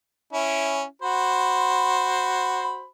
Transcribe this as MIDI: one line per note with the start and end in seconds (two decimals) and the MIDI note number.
0.33 0.84 61
0.33 0.84 64
1.02 2.86 66
1.02 2.86 72
1.02 2.86 83